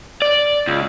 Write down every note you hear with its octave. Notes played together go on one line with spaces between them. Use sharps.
D5
C#2